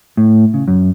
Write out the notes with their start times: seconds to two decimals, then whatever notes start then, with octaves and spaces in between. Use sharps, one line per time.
0.17 A2
0.54 C#3
0.68 F#2